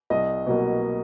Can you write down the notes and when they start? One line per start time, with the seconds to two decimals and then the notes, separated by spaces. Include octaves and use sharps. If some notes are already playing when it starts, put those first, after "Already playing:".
0.10 C2 D#5
0.47 B2 F#3 A#3